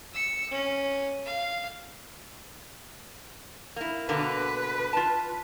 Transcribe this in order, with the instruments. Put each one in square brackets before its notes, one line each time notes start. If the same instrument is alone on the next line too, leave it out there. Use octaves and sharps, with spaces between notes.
[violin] E6 C#7
C#4
F5
[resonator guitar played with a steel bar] A#3 E4
[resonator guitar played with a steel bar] B2 D3 A#3 [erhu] B4
[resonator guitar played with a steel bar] F4 A5